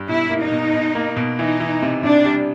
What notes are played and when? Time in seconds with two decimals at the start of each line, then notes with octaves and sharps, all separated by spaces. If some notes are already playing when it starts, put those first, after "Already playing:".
Already playing: G2
0.08 B2 E4
0.30 A#3
0.41 D#4
0.52 B2
0.73 B2
0.95 A#3
1.16 B2
1.39 E3 D#4
1.60 E3
1.82 C3
2.03 C3 D4
2.25 G3